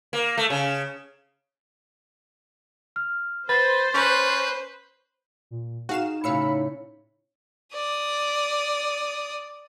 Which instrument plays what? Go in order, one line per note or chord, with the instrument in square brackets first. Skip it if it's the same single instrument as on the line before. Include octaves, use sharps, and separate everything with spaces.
[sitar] A#3
A3
C#3
[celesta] F6
[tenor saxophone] B4 [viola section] C5 [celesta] A6
[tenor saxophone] C#4 [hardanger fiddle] B4
[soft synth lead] A#2
[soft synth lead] D#4 [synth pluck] F#4 F5 E7 [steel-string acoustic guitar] G#4
[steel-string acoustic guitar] A2 C#3 [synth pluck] F5 E6 C#7 [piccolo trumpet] B5
[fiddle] D5 D#6